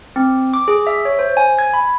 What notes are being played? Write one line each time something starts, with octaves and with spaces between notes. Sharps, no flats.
C4
D6
G#4
E5
C#5
C5
G#5
G#6
B5